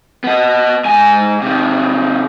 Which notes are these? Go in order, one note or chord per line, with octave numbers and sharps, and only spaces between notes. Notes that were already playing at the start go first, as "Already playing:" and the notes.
B3 D#5
G#2 G#5
C3 D#3